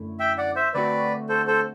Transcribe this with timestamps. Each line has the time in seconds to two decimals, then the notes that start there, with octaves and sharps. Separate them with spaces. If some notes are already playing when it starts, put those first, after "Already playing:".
Already playing: F#2 D3 A3 E4
0.20 E5 G5
0.38 D5 F#5
0.56 C5 E5
0.74 D3 A3 C4 F#4 B4 D5
1.29 A4 C5
1.47 A4 C5